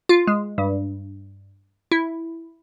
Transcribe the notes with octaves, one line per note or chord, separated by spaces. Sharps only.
F4
G#3
G2
E4